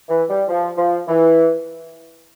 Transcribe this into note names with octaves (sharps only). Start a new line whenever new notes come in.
E3
G3
F3
F3
E3